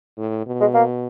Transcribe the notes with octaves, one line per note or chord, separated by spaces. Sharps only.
A2
B2
G#3
A#3